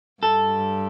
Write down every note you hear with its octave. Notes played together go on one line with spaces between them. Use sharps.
G2 A4